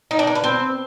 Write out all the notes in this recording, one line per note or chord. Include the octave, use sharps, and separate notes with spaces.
D#4
D4
A#4
B4
C4